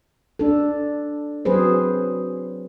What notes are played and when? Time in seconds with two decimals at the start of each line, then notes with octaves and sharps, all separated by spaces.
0.39 D4 A4
1.45 F#3 C4 G#4 B4 C5